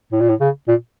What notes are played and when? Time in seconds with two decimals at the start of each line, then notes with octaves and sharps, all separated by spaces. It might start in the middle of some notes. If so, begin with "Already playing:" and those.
0.12 A2
0.20 A#2
0.29 A2
0.40 C#3
0.68 A#2